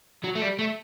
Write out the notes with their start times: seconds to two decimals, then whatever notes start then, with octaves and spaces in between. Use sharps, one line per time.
0.24 F#3
0.35 A3
0.42 G3
0.59 A3